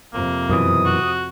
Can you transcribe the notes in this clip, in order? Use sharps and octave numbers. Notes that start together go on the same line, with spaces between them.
F2 C3 A#3
F#2 B2 E3 D#6
F#4